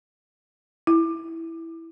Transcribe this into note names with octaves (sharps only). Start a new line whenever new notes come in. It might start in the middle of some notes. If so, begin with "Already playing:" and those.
E4